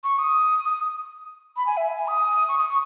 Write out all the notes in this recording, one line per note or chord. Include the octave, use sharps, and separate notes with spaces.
C#6
D#6
D#6
B5
G#5
E5
G#5
D#6
C#6
D#6
C#6